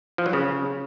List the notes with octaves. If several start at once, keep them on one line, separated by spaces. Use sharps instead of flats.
F3
F#3
C#3